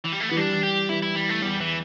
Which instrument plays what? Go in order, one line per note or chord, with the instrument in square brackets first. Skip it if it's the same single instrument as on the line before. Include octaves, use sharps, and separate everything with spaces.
[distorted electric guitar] E3
G3
A3
[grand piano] E3 [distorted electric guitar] B3
[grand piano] G3 [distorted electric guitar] D4
[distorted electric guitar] G4
[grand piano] E3 [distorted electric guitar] E4
[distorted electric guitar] E4
G3
A3
[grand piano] E2 [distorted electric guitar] G3
[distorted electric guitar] E3